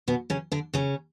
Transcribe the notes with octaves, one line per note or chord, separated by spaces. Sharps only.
B2 B3
C#3 C#4
D3 D4
C#3 C#4